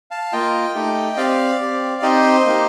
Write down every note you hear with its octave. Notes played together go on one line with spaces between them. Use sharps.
F5 A5
A#3 F4 D#5 G5
A3 D#4 G4
C4 G4 D5 F5
C4 G4
C4 D#4 G4 C5 D#5
A#3 D#4 G4